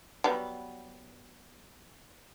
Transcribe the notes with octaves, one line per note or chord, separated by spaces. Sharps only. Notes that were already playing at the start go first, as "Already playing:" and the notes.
F#3 G3 B3